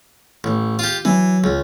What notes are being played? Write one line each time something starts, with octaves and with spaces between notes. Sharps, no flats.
A1
F4 G4
E3 F#3
C#2